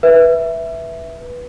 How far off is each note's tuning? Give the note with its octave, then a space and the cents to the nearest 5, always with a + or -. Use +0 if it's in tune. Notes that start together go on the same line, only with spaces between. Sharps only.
B4 -10 E5 +0